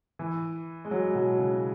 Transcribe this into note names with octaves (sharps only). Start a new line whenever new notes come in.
E3
G#3
F#3
B2
C#3